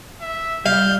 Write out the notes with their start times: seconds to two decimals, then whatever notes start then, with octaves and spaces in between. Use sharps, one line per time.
0.22 E5
0.66 G3 F5 G6